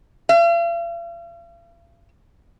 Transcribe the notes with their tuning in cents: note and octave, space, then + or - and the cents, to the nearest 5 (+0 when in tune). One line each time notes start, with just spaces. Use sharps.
F5 -45